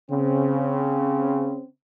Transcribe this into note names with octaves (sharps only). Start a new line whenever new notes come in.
C#3 C4